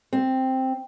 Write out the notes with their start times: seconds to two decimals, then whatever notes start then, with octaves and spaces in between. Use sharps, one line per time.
0.13 C4